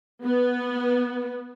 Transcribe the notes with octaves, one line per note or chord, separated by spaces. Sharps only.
B3